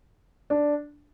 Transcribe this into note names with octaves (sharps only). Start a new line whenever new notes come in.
D4